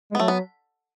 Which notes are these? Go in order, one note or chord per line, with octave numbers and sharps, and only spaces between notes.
G#3
B3
F#3 A3
B3